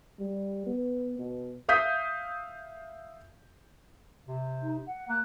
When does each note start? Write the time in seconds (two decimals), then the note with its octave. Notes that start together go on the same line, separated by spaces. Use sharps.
0.20 G3
0.66 B3
1.19 B2
1.68 E5 F5 D#6 G6 B6
4.28 C3
4.62 D#4
4.86 F#5
5.09 A#3 F#6